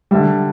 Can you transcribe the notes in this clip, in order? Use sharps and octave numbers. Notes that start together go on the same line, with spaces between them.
D3 G3 E5